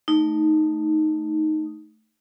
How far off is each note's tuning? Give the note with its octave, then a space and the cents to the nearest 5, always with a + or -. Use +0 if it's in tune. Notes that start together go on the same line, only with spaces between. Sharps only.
A3 +0 D#4 +0